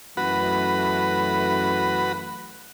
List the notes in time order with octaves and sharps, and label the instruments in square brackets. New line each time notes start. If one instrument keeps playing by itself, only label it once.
[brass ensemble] F#2 E3 A3 [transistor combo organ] F#4 B4